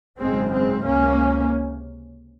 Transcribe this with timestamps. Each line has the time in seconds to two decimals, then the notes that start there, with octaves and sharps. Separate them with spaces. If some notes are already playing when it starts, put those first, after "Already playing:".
0.18 G#1 F#2 C#3 G#3 C4
0.51 G#3 C4
0.84 C#2 C3 A#3 C#4